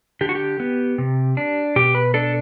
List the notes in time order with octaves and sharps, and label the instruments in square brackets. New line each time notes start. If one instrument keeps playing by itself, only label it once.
[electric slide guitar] D3 G4
F#4
G4
B3
C3
D4
B2 G4
B4
D4 A4